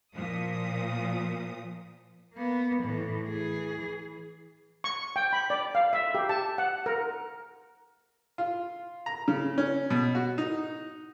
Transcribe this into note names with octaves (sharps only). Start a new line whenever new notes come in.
A#2 F3 D#6
A#3 B3
A2 E3
E3 G#4
C#6
G5
B5
D5
F5
E5
G4
A5
F#5
A#4
F4
A#5
C#3
C#4
B2
F#4
D#4